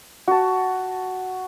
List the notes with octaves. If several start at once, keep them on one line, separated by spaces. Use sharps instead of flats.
F#4 A5